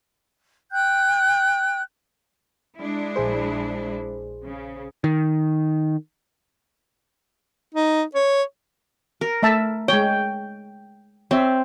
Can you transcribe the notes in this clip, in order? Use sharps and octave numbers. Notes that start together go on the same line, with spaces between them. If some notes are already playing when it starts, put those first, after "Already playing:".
G5 F#6 G6
G#3 D4 E4
A#1 G#4 C5
C#3
D#3
D#4
C#5
A#4
A3 E5 A5
G#3 C#5 G5
C4 C#5 E5